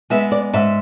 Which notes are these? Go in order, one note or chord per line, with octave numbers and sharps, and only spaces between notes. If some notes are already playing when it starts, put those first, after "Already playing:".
G#3 B3 E5
D5
G#2 E5